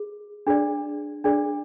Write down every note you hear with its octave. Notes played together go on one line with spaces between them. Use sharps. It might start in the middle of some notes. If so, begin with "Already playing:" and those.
Already playing: G#4
D4 G#4 D5
D4 G#4 D5